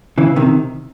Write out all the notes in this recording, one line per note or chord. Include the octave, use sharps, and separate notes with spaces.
C#3 E3
C3 D#3